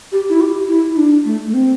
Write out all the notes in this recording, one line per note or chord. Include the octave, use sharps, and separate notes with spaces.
G4
E4
G4
E4
E4
D4
A3
A3
C4